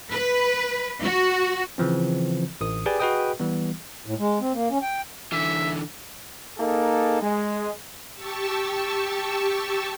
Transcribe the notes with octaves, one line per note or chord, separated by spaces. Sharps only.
B4
F#4
C#3 E3 F3 C4
A1 D#6
G4 G#4 B4 D5 G5 G#5
F#4 G#4 B4 D#5 G5 D#6
E3 G3 B3
A2
G#3
C4
A#3
C#4
G5
D3 E3 E5
A#3 D#4 G#4 A4
G#3
G4 A5 C#6 E6